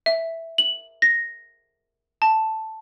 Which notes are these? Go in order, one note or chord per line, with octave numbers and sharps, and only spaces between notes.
E5
F#7
A#6
A5